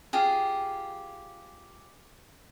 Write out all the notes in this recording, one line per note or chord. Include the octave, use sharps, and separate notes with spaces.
F4 G4 G#4